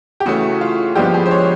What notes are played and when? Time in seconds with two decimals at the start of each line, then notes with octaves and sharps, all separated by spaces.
0.20 G4
0.26 C#3 E3 A3 F#4
0.61 F4
0.95 G2 D3 F3 G#3 B3 G4
1.14 G#4
1.26 C5
1.31 C#5